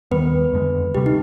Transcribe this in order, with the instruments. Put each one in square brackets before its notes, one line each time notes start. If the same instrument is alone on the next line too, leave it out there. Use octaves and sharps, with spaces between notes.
[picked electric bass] D#2 D#3 G3 B3 [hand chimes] B4
[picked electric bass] F2 D3 G#3
[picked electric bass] D2 C3 G3 [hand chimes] G4
[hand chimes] D#4